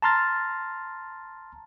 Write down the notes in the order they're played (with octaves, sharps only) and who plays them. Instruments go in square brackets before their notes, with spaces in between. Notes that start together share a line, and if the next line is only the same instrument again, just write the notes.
[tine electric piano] A5 A#5 C6 F6 A6